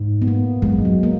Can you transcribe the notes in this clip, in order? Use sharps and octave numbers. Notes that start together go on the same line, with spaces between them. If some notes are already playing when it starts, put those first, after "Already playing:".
Already playing: G#2
B3
A#3
F#2 G#3
F#2
F#3
A#3